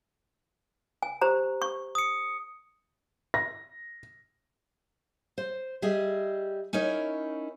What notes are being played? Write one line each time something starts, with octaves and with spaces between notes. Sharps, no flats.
G#5
G4 C5 A#5
C#6
D#6 C#7
A#6
C5
G3 G#4 D#5 E5
C#4 D#4 E4 A#4 C#5